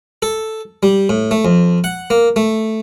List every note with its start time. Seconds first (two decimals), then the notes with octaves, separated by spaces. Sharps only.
0.22 A4
0.83 G3
1.09 A2
1.31 A3
1.45 F2
1.84 F#5
2.10 A#3
2.36 A3